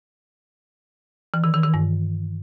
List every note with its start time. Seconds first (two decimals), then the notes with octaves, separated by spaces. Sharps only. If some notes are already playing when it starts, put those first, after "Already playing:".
1.34 E3
1.44 D#3
1.54 D#3
1.64 D#3
1.74 G2